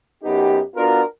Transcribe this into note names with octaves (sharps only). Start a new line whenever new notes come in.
F#2 B3 D#4 G4
B3 D4 F4 F#4 A#4